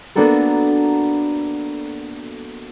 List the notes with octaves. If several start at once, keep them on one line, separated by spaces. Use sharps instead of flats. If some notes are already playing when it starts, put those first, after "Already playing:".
A#3 B3 D4 F#4 A4 A#4